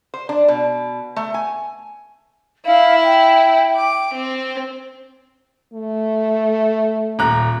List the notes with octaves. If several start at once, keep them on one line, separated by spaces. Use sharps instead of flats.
C5
D4
B2
A3
G#5
E4 F5
G5
D6
C4
A3
D#1 A#5 F#6